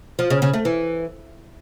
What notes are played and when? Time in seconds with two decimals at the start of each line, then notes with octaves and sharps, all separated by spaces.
0.19 F3
0.30 C#3
0.42 C#3
0.54 A3
0.65 E3